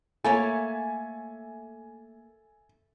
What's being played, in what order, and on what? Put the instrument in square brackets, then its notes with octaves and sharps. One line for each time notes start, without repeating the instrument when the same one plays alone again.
[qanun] A3 A#3 C#5 [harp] A4 E5 [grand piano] G#5